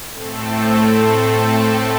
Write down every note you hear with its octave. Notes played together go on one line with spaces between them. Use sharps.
A2 A3 C4 A4